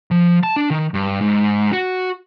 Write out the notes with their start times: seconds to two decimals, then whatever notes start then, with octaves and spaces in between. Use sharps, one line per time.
0.11 F3
0.43 A5
0.56 D4
0.70 D#3
0.94 G2
1.21 G#2
1.73 F#4